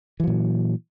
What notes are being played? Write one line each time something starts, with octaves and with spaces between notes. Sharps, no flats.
A#2 E3 F#3